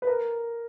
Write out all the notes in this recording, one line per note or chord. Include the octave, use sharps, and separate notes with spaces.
B4
A#4